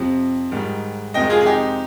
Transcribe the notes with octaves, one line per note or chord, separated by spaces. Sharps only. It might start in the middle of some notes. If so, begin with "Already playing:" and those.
Already playing: F2 C3 F3
G#2 D#3 G3
F2 C3 D#3 G#3 D#5 G5
F4 G#4
G#4
D#4 G4